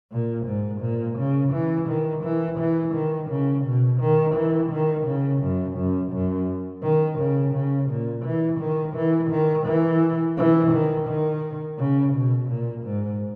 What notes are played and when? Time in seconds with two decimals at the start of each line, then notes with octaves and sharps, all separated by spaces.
0.12 A#2
0.46 G#2
0.81 A#2
1.18 C#3
1.53 E3
1.89 D#3
2.24 E3
2.59 E3
2.94 D#3
3.30 C#3
3.65 B2
4.00 D#3
4.35 E3
4.71 D#3
5.06 C#3
5.42 F#2
5.77 F#2
6.12 F#2
6.83 D#3
7.19 C#3
7.54 C#3
7.90 A#2
8.25 E3
8.60 D#3
8.96 E3
9.30 D#3
9.67 E3
10.37 E3
10.72 D#3
11.07 D#3
11.79 C#3
12.14 B2
12.49 A#2
12.85 G#2